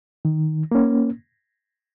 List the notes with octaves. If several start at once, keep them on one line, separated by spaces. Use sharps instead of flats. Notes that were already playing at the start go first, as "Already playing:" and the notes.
D#3
A#3 C#4